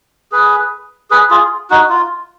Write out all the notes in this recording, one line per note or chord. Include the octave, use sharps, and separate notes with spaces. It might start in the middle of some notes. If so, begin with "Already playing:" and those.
G#4 B4
G#4 B4
F4 G#4
D#4 F#4
F4